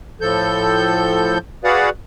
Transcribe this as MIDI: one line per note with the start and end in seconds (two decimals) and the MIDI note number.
0.21 1.38 45
0.21 1.38 53
0.21 1.38 69
0.21 1.38 91
1.64 1.90 66
1.64 1.90 68
1.64 1.90 71
1.64 1.90 74
1.64 1.90 77
1.64 1.90 78